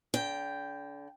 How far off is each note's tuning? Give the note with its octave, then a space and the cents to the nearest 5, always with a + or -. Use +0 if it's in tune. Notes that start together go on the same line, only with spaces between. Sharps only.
D3 -35 G5 +0